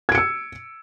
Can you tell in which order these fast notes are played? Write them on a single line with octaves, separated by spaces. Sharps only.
G#6 D7 C#7 E6